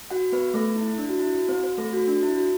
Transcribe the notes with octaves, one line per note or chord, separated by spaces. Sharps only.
F#4 F#5
B3 B4
A3 A4
E4
E4
D4
F#4
E4
F#4
C4 C5
C4 C5
A3 A4
F#4
D4
E4
F#4